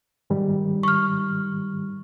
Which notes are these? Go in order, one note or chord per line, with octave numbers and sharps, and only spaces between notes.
G#2 D#3 G3
C#6 F6